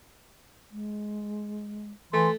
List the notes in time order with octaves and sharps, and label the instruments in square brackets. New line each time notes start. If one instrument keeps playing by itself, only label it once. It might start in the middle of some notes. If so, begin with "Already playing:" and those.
[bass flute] G#3
[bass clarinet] E3 [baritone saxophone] A3 [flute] C6